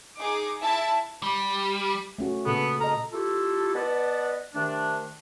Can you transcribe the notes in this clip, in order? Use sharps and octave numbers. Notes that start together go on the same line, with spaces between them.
D#4 G#4 D6
E4 E5 A5
G3
A3 C#4 F#4
A#2 C#3 B3 A4
A4 D#5 A#5
A3 E4 F4 G4 A4
B3 B4 D5 D#5 F#5 A5
C3 D#3 A3 D4